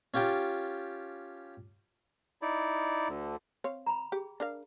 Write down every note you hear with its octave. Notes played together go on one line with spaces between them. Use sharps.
C#4 F4 G4 G5 A5
D#4 E4 D5
D2 D3
C4 C#5 F5
A#5 B5
G4 G#4
D4 A#4 F5